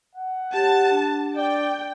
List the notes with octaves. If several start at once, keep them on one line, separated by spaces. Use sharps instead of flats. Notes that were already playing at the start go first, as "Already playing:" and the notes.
F#5
G4 C#5 A5
D4
D5 G5